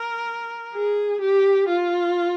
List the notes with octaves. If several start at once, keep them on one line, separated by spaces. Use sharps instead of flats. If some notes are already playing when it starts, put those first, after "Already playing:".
Already playing: A#4
G#4
G4
F4